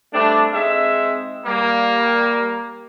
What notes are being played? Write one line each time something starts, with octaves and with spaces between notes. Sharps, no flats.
G3 A3 C4 D4
G#3 C4 D#4 E5
G3 A#3